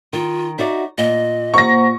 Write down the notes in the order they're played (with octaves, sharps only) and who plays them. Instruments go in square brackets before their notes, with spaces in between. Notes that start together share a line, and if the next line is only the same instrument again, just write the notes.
[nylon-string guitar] D#3 [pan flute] F4
[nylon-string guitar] D#4 F#4 D5 [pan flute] E5
[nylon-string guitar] A#2 [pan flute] D#5
[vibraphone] A#3 C5 F#5 [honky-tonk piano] C#6 A#6